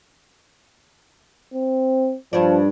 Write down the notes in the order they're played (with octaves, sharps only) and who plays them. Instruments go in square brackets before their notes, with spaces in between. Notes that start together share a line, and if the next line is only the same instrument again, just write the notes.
[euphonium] C4
[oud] G2 D4 [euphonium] F3